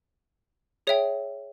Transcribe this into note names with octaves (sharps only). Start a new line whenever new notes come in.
G#4 C#5 E5 G5